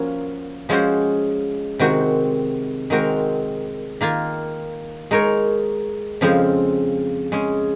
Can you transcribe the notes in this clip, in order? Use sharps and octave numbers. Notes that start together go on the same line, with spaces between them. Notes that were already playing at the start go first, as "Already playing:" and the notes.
Already playing: F3 A#3 C#4 F#4
F3 G#3 C#4 F#4 C5
C3 D#3 G#3 C4 F#4
D#3 G#3 C4 F#4 A#4
D#3 A#3 F4
G#3 D#4 A#4 C#5
F2 C#3 F3 G#3 C4
G#3 C#4 G#4